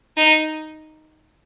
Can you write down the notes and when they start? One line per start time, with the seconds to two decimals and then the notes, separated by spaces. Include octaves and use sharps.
0.17 D#4